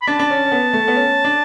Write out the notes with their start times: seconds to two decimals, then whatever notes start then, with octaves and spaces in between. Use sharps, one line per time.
0.02 B5
0.07 D4 A5
0.19 D4
0.30 C#4
0.45 C#4
0.52 B3
0.73 A3
0.88 B3
0.95 C#4
1.24 D4